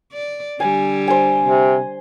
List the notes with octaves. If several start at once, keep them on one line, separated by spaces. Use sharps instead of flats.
D5
D3 G3 G#5
C5 G#5
C3